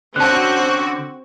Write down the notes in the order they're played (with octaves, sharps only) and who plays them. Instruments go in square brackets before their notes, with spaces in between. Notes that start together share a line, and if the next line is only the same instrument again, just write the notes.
[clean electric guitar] D3 C#4 [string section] C4 F#4 [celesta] A5 F#6